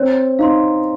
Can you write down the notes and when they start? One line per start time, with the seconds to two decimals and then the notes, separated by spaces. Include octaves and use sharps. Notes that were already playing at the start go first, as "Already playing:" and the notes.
Already playing: C4 C#5
0.39 D#4 F5 C6